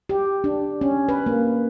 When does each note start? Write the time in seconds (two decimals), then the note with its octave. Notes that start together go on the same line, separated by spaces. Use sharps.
0.09 G4
0.44 D4
0.81 C#4
1.09 B4
1.26 A#3